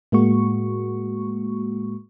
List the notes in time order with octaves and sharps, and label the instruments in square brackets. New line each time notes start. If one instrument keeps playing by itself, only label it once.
[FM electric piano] A2 G#3 A#3 F#4 C#6